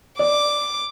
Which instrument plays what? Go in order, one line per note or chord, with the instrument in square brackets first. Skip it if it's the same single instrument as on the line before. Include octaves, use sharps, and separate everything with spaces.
[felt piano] D5 [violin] D6